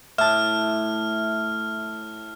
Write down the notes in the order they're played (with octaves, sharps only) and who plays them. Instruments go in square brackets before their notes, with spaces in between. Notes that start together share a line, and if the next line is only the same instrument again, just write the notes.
[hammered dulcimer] A2 [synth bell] E5 A5 [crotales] F6